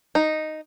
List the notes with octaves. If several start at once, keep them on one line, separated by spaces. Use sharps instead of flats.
D#4